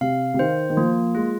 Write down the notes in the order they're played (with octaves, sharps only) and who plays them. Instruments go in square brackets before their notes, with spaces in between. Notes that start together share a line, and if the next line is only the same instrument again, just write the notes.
[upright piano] C3 [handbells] F5
[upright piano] C3
[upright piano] D#3 [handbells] C5
[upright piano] D#3
[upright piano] F3 [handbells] A#3
[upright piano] G#3 [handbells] F4